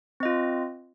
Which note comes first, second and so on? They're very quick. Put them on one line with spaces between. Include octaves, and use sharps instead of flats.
C4 D#5 F4